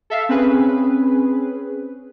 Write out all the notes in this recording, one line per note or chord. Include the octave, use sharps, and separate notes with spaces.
A4 E5 F5
C4 C#4 G#4 B4